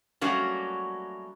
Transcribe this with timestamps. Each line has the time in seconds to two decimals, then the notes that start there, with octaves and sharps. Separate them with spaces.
0.21 F#3 G3 A3 A#3 C#4 F#4